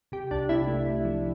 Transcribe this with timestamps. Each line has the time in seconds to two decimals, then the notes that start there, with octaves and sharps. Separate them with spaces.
0.12 C3 G4
0.31 C2 D4
0.49 C3 E4
0.68 A3
0.87 C3
1.05 F3